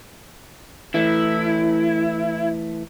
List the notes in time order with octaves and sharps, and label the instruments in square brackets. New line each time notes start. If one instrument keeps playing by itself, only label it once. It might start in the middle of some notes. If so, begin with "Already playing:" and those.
[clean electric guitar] E3 A3 [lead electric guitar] E4